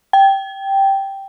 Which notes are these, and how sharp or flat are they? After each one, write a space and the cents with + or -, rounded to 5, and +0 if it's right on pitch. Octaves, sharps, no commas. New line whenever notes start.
G5 -5